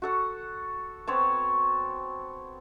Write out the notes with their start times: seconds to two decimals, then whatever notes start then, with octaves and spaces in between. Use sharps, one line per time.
0.02 F#4 A4 F#5
1.07 B3 C4 C#5 A5